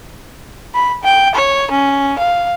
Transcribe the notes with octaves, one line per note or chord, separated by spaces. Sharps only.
B5
G5
C#5
C#4
F5